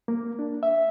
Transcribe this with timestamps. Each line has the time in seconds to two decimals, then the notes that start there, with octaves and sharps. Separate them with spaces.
0.08 A#3
0.39 D4
0.63 E5